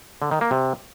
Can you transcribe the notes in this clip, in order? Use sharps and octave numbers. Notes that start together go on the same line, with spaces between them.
D3
D#3
A#3
C3